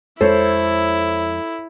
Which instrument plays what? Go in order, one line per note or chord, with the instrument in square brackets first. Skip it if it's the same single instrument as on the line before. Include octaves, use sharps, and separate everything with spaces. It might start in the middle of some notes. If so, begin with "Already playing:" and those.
[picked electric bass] F2 G#3 [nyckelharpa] E4 [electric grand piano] A4 C#5 [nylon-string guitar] C5